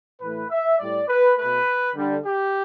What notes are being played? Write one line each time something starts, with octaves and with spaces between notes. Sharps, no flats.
A2 E3 A3 B4
E5
A2 G3 D5
B4
B2 A3 B4
D3 G3
G4